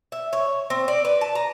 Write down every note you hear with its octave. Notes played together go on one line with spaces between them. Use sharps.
E5
C#5
C4
D5
B4
A5
A#5